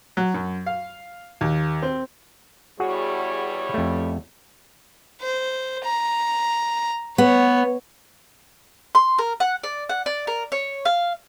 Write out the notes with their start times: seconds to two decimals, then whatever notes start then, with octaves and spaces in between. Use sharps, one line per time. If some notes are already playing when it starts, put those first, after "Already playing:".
0.17 F#3
0.34 F#2
0.66 F5
1.41 D#2
1.82 C4
2.80 E2 G3 F#4 G#4 C#5 F#5
3.74 F2 A3
5.21 C5
5.85 A#5
7.18 B3 C#5
8.95 C6
9.19 A#4
9.40 F#5
9.64 D5
9.90 F#5
10.06 D5
10.27 A#4
10.52 C#5
10.85 F5